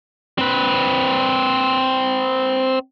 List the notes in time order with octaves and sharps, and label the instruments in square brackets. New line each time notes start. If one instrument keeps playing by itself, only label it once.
[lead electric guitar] C4 B4